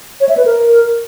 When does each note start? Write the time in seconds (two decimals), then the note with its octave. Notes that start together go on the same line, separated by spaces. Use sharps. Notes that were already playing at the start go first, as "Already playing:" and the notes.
0.21 C#5
0.29 E5
0.37 B4
0.45 A#4